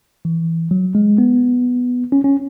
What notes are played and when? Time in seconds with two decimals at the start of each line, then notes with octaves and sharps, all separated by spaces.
0.25 E3
0.71 F#3
0.95 G#3
1.18 B3
2.12 C#4
2.24 C#4